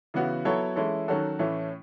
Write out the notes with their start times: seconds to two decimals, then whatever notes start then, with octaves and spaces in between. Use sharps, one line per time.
0.14 C#3 E3 B3 F#4
0.45 F#3 B3 E4 A4 C#5
0.76 E3 G#3 C#4 E4 A4
1.08 D#3 F#3 C#4 F#4 A4
1.39 A2 E3 A3 C#4